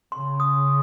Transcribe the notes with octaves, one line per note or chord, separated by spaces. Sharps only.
C#3 C6
D#6